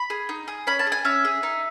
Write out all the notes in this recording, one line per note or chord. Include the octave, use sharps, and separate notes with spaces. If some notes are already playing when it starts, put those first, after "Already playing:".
Already playing: B5
G#4
D#4
G#4
C#4 B5
A5
G#4
G#5
C#4 E5
G#4
D#4